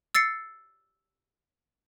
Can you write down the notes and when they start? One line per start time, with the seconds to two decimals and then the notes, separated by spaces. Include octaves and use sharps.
0.15 E6 A6 C7 C#7